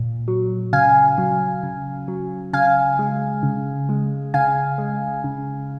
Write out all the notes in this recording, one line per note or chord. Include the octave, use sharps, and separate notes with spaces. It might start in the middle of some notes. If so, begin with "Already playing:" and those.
Already playing: A#2
F#3
C#3 F5 G#5
F#3
C#3
F#3
C#3 F5 G#5
G#3
C#3
G#3
C#3 F5 G#5
G#3
C#3